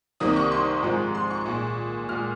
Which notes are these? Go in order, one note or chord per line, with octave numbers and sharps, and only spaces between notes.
C2 C3 D#3 A#3 D#6
C#6
C6
G#2 F3 G#3
C6
C#6
A#2 G#3
A#2 G#3 F6